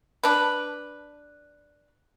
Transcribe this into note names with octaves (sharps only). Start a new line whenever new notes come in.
D4 B4